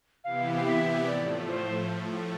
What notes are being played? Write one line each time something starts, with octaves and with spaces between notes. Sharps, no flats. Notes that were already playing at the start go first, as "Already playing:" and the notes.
C3 E3 B3 E4 G4 F5
E5
A2 F3 A3 D5
C5